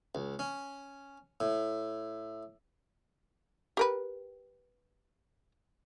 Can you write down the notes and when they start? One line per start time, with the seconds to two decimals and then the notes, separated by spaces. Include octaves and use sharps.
0.15 C#2
0.39 C#4
1.40 A2
3.77 G4 A#4 B4